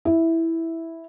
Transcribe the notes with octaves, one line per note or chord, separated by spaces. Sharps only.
E4